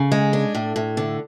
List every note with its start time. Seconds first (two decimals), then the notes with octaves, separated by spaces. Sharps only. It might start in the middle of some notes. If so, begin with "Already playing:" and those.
Already playing: C#3
0.12 G#3
0.33 D4
0.55 A2
0.76 A2
0.97 D3